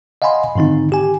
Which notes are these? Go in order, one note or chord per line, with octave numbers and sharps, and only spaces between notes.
D#5 F5 F#5 G#5 B5 C6
G#2 D3 D#3 C4 D#4
G4 G#5